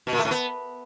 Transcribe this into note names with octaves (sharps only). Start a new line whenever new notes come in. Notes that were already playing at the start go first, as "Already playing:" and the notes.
B2
A#2
A3
A2
B3